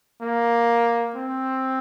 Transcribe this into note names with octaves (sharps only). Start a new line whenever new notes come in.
A#3
C4